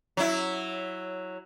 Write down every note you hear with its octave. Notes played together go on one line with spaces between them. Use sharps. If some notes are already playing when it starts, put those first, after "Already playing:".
F#3 E4